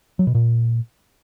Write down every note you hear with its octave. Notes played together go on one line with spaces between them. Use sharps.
F#3
B2
A#2